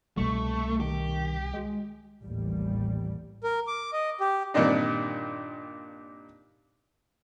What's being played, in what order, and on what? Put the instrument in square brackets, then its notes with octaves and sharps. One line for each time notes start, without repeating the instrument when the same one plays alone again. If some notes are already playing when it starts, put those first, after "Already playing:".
[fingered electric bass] C2 B2 G3 [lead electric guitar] A3 [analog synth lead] C#6
[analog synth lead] D#3 [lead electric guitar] G4
[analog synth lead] G#3
[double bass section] A1 D#2 G3
[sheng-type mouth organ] A#4
D6
D#5
G4
[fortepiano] G2 A#2 D#3 C4 D4 D#4